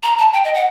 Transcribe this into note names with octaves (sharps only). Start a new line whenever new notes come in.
A#5
A5
G5
D#5
F#5